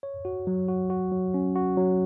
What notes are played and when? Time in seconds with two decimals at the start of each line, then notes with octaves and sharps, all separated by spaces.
0.03 C#5
0.25 F#4
0.47 F#3
0.68 F#4
0.90 F#4
1.12 F#3
1.34 C#4
1.56 F#4
1.77 F#3